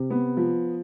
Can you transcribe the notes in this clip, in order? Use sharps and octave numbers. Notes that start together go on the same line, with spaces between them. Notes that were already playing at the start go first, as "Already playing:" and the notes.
Already playing: C3
B3
F3